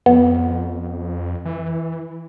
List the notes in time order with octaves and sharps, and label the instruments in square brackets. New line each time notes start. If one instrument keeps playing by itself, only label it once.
[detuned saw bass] F2 [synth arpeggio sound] B3
[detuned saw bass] E3